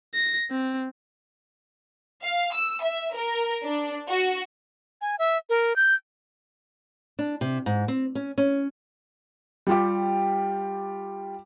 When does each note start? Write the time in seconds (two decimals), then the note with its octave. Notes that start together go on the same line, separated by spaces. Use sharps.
0.15 A#6
0.51 C4
2.23 F5
2.53 E6
2.82 E5
3.14 A#4
3.63 D4
4.09 F#4
5.01 G#5
5.19 E5
5.50 A#4
5.76 G6
7.19 D4
7.41 C3
7.66 G#2
7.88 C4
8.15 C#4
8.38 C#4
9.67 G3 F4 G4